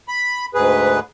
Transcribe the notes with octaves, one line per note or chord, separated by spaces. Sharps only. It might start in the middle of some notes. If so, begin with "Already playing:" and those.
B5
D2 G#2 G#4 B4